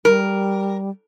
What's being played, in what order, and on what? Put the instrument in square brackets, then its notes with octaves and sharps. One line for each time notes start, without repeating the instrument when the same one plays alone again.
[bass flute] G3 [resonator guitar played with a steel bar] A#4